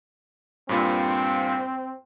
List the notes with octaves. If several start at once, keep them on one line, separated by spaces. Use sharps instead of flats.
G2 A#2 C4 F4